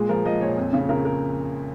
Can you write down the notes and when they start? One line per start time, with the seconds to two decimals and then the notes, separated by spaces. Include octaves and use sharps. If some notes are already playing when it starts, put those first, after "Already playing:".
Already playing: A#2 G#3 G#4
0.09 F3 A#4
0.25 F3 D#5
0.41 A#2 C#5
0.58 F2
0.73 C#3
0.89 C#3 A#4
1.05 A#4